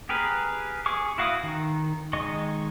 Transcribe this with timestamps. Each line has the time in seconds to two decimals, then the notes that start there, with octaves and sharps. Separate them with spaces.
0.09 G4 G#4 A#4 B4
0.86 G#4 G#5 C#6 D6
1.18 E4 F#4 F5 D6 D#6
1.43 D#3
2.13 D#3 G#3 D#5 C#6